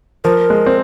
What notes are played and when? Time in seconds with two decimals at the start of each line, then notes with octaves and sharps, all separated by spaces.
0.24 F3 A#4
0.50 G#3
0.66 C4